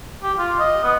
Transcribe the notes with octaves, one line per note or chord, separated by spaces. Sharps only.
G4
F4
D#5
B3